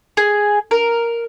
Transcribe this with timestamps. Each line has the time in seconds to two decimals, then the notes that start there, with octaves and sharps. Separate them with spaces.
0.17 G#4
0.71 A#4